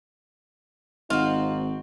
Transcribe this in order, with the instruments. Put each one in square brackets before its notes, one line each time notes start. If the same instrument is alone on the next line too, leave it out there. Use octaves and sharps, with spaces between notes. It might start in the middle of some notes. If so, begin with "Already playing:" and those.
[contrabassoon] G#1 [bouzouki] C4 F#4 [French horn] D#4 [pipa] F4